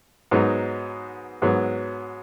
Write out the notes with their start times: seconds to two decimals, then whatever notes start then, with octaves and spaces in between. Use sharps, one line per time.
0.31 G#2 F#3 B3 D#4
1.42 G#2 F#3 B3